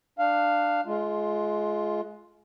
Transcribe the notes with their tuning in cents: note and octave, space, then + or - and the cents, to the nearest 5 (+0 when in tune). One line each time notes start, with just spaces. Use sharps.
D4 +15 F5 +0
G#3 +25 F4 -5